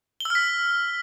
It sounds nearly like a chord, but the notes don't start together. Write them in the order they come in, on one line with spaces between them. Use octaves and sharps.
G7 E6 F6 B6